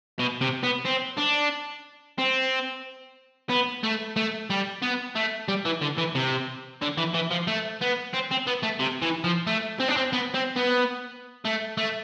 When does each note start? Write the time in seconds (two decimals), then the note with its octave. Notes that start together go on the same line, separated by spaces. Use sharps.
0.19 B2
0.41 C3
0.64 B3
0.85 C4
1.18 D4
2.18 C4
3.49 B3
3.83 A3
4.16 A3
4.50 G3
4.82 B3
5.15 A3
5.48 G3
5.66 E3
5.82 D3
5.98 E3
6.15 C3
6.82 D3
6.98 E3
7.14 E3
7.31 F3
7.47 A3
7.81 B3
8.13 C4
8.31 C4
8.47 B3
8.63 A3
8.80 C3
9.02 E3
9.24 F3
9.47 A3
9.80 C4
9.88 D4
9.97 C4
10.13 B3
10.35 C4
10.56 B3
11.45 A3
11.78 A3